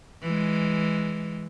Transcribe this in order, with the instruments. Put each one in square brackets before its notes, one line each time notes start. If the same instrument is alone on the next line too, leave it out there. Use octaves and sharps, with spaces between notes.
[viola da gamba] E3 G#3